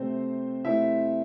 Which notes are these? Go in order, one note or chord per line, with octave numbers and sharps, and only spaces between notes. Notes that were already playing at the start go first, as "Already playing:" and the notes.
Already playing: C3 A3 C4 C5
C3 A3 E4 E5